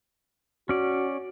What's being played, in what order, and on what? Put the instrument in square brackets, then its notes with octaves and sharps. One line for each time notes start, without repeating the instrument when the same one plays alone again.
[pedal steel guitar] C#4 D5 [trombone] F#4